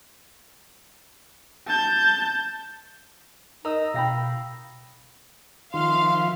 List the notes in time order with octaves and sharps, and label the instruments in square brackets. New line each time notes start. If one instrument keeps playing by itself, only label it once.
[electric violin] A5 G6
[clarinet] D#4 [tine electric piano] A#4 D#5 [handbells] A#5 D#6 E6
[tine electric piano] B2 A#6 [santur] F5 G5 B5
[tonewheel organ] D#3 F4 [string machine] F3 E5 [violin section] F5 [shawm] C6